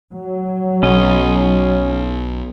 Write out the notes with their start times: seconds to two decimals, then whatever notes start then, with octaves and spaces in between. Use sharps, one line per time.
0.13 F#3
0.83 B1 C#4 D#5